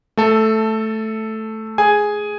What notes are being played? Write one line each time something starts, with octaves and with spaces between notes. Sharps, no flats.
A3 A4
G#4 G#5